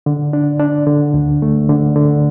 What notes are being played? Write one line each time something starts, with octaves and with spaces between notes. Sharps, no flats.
D3
D4
D4
D3
D2
A3
D3
D3